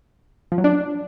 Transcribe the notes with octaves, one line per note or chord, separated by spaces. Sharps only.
F3
F#3
D4